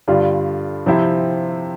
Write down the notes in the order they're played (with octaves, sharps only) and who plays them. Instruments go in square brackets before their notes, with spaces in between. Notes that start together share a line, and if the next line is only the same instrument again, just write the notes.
[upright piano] G2 D3 G3 D4 F4
C3 F3 C4 E4